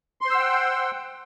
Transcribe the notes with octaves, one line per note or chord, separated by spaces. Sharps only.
C5 F#5 G5 C6 E6